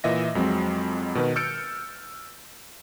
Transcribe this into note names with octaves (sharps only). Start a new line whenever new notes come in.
A#2 E3 D#5 E5 A#6
F2 F#3 G#3 C4
B2 D#3 B4
E6 F6 G6 A6 C#7 D7